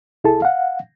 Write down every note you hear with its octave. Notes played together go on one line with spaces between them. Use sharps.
C2 E4 G#4 A4 A5
F5 F#5